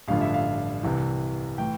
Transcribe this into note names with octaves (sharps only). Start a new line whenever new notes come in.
A1 G2 D3 F3 F5
E5
F5
C2 C3 E3
A2 E3 G5